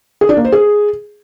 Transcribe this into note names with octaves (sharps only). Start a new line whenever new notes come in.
G#4
D4
A#3
C5
G#4